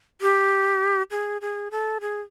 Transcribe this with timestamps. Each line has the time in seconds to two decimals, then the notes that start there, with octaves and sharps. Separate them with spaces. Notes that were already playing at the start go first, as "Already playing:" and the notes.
0.21 G4
1.11 G#4
1.41 G#4
1.71 A4
2.01 G#4